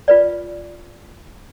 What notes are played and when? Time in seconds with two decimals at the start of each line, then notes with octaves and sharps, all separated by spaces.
0.08 F4 B4 D5